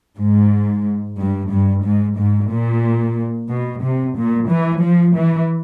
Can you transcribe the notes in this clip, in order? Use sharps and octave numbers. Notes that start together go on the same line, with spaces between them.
G#2
G2
G2
G#2
G#2
A#2
B2
C3
A#2
E3
F3
E3